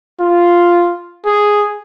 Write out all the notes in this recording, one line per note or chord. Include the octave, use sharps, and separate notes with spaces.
F4
G#4